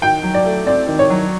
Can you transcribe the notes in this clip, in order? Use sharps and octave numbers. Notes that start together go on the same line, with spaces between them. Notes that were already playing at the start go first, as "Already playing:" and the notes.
D#3 G5
F#3
D5
A3
C4 D5
D#3
C#5
F#3